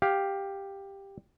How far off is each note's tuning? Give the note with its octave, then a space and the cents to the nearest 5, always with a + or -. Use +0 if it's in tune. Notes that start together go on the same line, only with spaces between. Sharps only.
G4 +5 F5 +10